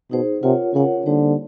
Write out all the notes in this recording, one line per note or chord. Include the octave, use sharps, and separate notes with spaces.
B2 D#4 G#4 C5
C3 F4 A#4 C#5 F#5
C#3 F4 A#4 C#5 F#5
D3 G3 A#3 D#4 G4 C5